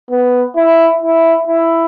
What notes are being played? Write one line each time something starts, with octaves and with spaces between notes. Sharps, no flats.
B3
E4
E4
E4